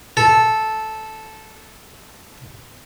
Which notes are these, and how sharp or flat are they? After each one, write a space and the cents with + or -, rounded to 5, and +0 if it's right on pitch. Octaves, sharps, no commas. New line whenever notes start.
A4 -10